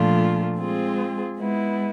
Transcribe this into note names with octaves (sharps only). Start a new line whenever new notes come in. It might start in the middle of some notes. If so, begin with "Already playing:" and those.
Already playing: A#2 F3 A3 D4 F4
G#3 C4 F4 G#4
G#3 B3 E4